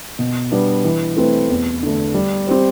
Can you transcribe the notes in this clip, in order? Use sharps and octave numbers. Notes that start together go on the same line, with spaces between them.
B2
G3 B3 D4
E3
A3 C4 E4 B4
E2
D3 A3
G3
C4 G4 C5